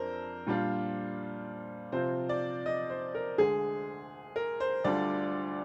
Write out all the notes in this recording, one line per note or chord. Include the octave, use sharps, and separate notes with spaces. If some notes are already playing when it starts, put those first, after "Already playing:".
Already playing: F2 D4 A#4 C5
A#2 G3 D4 F4
C3 F3 C4 F4 C5
D5
D#5
C5
A#4
D2 D3 G#3 G#4
A#4
C5
D2 D3 G3 D4 F4 D5